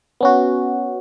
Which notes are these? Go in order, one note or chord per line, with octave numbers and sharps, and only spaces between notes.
B3 C#4 F#4